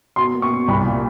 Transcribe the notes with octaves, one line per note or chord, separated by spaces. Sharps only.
B2 C6
A#3
C#6
B2
C2 B5
A#2